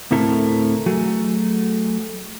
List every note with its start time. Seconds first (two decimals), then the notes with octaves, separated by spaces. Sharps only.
0.11 D2 A2 C4 E4 A4 A#4
0.86 F#3 A3 F#4 G#4